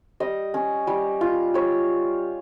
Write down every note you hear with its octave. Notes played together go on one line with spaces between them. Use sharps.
G3 D#5
C#4
G3
F4
G3 C#5